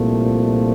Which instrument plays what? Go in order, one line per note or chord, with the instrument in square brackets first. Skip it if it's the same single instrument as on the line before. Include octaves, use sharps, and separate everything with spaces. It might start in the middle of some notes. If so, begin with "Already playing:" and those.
Already playing: [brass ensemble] C2 A#2 F3 A3